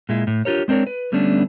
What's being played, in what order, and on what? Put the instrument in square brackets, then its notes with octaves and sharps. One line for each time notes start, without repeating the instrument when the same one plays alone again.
[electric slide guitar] A#2 G#3 E4
A2
D4 F4 G4 A#4 C#5
G#3 C4 D4 A#4 C#5
B4
D3 G3 A3 B3 C#4 D4